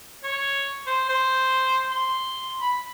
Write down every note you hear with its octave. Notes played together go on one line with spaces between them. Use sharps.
C#5
C5
C5
C6
B5